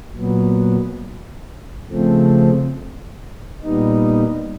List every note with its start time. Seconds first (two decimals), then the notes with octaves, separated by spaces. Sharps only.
0.15 A#2 F#3 B3
1.89 C#3 F3 A3 C4
3.63 A#2 G3 B3 D#4